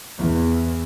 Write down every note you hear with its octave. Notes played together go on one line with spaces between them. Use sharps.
E2